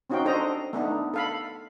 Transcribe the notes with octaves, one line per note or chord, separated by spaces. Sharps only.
C4 C#4 D#4 F#4 F5 G5
D4 A4 C5 D#5 A#5
A3 B3 D4 D#4
A4 F5 B5